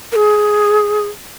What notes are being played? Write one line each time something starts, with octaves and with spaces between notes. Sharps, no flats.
A#4
G#4